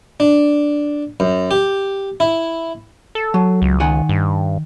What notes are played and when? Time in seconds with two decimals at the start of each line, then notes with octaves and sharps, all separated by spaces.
0.20 D4
1.20 F#2
1.51 G4
2.20 E4
3.15 A4
3.34 F#3
3.62 C#2
3.80 D#3 F#5 G#5
4.09 G2